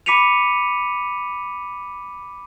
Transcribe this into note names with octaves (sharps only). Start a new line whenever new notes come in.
B5 D6 B6 C#7 D#7 F7